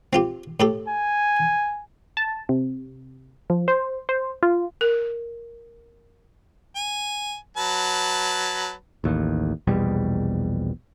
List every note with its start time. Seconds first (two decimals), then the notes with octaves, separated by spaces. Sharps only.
0.13 C4 F4 G4
0.60 A2 G4 A4
0.88 G#5
2.17 A5
2.49 C3
3.50 F3
3.68 C5
4.09 C5
4.43 F4
4.81 A#4
6.76 G#5
7.57 F#3 B4 A5
9.04 A1 D#2
9.67 A#1 E2 B2 G3